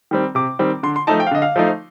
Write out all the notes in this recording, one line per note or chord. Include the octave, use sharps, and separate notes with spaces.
D#3 G3 C4
C3 D6
D#3 G3 C4
D3 C6
C6
F3 A3 D#4 A5
G5
F5
D3 D#5
F5
F3 A3 D#4